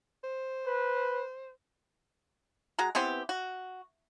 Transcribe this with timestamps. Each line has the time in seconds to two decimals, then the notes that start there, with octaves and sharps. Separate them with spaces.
0.24 C5
0.67 B4
2.79 G#3 F#4 A#5
2.95 E3 B3 C4 G4
3.29 F#4